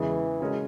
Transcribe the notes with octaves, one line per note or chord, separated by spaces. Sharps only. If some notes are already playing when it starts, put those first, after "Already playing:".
Already playing: E2 C#3 E3 G#3
C#3 G#3 C#4 F#4 A#4